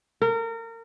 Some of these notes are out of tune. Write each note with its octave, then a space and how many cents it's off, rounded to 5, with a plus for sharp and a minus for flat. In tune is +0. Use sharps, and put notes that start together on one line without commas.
A#4 -30